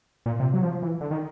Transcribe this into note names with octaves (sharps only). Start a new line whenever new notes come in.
A#2
C3
F#3
F3
E3
D3
D#3